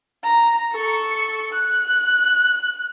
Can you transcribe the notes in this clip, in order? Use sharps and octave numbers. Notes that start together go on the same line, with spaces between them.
A#5
A4 C#6
F#6